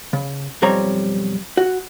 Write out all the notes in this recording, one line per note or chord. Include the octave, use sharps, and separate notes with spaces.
C#3
B1 F2 G3 C4 C#5 A#5
F#4